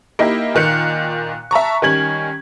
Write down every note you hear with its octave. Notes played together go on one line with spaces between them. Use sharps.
A#3 D#4 E4 G4
A#2 D#3 F#6 C#7
E5 A5 A#5 C#6
D#3 G3 C#4 G#6 F#7